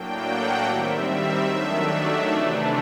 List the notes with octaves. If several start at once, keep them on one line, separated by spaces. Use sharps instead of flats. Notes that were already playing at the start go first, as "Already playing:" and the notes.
Already playing: A2 F#3 A#3 D4 G5
F#5
D#3 G3 C4 E5
D#3 F#3 A3 D4
C3 E3 A3 D4